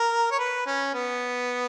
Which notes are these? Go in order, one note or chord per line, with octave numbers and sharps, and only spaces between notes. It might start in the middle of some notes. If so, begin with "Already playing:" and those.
Already playing: A#4
C#5
B4
C#4
B3